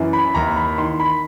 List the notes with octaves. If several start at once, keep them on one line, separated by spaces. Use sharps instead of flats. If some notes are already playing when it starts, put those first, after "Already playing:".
Already playing: F#2 E3
B5
D#2 A#5
B5
D#3 C6
B5